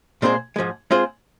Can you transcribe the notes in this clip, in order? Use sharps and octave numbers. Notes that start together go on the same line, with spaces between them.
A#2 G#3 C4 G#4 C5
G#2 F3 G#3
G#3 C4 F4 G#4 C5